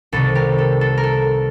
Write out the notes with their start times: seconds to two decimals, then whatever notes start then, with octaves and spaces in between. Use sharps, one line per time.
0.12 C2 C3 D#3 A4
0.35 G4 A#4
0.58 A4
0.81 A4
0.97 A#4
1.03 A4